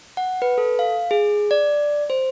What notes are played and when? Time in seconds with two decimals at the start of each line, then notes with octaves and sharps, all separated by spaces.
0.17 F#5
0.42 B4
0.58 A4
0.79 F5
1.11 G#4
1.51 D5
2.10 C5